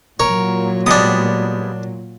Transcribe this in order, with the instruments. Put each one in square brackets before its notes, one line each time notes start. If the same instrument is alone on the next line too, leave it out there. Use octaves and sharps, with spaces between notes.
[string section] A#2 F#3 [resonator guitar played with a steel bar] A#4 [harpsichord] C#5
[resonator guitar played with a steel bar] G3 G#3 B3 [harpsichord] D4 D#6